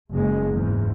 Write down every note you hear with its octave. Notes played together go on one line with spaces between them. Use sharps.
F#1 G#3
E2 G#2